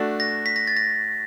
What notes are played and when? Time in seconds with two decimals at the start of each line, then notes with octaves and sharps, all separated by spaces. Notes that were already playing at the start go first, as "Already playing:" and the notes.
Already playing: A3 D4 F#4
0.20 A#6
0.46 B6
0.56 A#6
0.67 A6
0.77 A#6